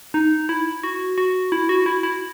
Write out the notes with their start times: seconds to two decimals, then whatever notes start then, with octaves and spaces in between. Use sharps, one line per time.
0.14 D#4
0.49 E4
0.83 F#4
1.18 F#4
1.52 E4
1.69 F#4
1.86 E4
2.03 E4